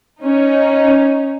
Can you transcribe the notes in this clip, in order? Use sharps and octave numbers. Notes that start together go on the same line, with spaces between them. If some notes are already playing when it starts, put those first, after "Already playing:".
C#4 D#4